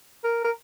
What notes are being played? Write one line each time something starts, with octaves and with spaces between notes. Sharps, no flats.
A#4
A#4